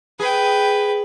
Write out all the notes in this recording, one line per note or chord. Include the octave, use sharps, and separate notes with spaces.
G#4 B4 G5